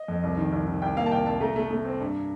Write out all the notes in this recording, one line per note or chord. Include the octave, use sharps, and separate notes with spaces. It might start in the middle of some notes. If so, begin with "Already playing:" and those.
Already playing: D#5
F2
C2
D#3
C2
D#3
C2 G5
A#3 F5
A5
C2 G5
C2 A5
A3 A#5
A3
A3
C4
G2